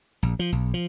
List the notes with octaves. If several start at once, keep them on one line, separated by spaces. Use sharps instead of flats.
A#1
F3
B1
F3